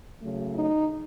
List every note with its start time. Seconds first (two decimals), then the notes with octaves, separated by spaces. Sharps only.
0.21 C#3 F#3 A3
0.54 D#4